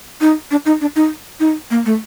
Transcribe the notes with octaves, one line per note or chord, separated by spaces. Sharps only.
D#4
D4
D#4
D4
D#4
D#4
A#3
A3